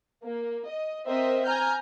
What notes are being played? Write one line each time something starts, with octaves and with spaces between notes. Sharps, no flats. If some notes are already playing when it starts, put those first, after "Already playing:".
A#3
D#5
C4 A#4 C5 D#5 E5
G#5 A#5 F6 G6